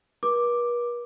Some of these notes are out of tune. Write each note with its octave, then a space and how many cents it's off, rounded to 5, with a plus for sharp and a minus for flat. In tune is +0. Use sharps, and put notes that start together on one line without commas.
B4 -45 D6 +0